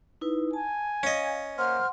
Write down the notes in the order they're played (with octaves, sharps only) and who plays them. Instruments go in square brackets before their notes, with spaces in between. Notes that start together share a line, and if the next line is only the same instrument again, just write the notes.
[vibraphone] D#4 E4 B4
[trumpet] G#5 [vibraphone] A5
[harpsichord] C#4 D#5 [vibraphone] F5
[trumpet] A#3 [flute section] C5 F6 [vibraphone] F#5 C6